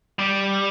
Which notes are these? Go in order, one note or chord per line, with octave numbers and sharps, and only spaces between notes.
G3